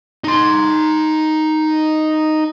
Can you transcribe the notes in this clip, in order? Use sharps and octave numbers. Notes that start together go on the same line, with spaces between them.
D#4 C6